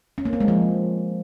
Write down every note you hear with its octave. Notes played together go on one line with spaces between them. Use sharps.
C#4
A#3
C4
G#3
F3